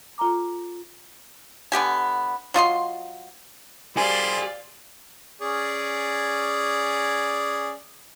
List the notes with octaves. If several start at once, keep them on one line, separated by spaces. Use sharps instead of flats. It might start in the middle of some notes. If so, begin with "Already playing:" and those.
F4 A4 A#5 D6
D3 B3 G4 G#5
F#3 F4 D#5 C6
G3 G4 G#4 C5 D5 F5 G#5
C#4 G#4 D5